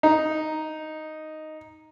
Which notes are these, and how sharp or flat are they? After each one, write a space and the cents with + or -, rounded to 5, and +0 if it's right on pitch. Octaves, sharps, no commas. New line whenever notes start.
D#4 +0